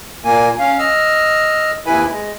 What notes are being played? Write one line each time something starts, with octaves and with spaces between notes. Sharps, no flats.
A#2 A#3 G#5
C#4 F5
D#5 E6 F6
D#2 C3 E4 B4 G#5 B5
G#3